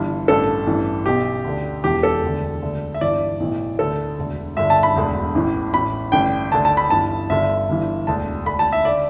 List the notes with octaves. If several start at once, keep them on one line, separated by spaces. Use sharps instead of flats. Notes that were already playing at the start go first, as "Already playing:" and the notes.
Already playing: G1 G2 E3
A1 G2 D3 A4
A1 G2 E3
B1 B2 G4
D2 D3
E1 E2 E3 G4
A4
E1 D2 D3
D2 D3
E5
G1 G2 E3 D5
B1 A2 E3
D2 D3 A4
E1 D2 D3
G1 G2 D3 E5
A5
B5
E1 D2 D3
A1 A2 E3
A1 A2 E3 B5
A1 G2 D3 G5
D2 D3 A5
A5
B5
G1 G2 E3 A5
G1 G2 D3 E5
G1 G2 E3
E1 D2 D3 A5
D2 D3 B5
A5
E5
D3 D5